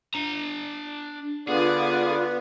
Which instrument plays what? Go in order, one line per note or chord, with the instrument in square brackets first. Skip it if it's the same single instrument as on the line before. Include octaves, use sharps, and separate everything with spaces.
[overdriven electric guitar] D4 A#5
[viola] D3 D5 [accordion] B3 [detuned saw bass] F4 [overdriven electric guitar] G#4